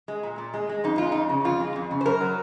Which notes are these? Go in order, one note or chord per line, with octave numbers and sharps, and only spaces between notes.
G#3
A#2
A#2
G#3
G#3
F2 D#4
G#3 F4
F2 D#4
C#3
F2 F4
G#3
F2
C#3
C5
F#2 A#4
F#3